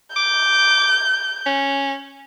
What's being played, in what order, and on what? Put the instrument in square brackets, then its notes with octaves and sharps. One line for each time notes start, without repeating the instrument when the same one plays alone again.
[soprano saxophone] D6 [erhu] G6
[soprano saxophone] C#4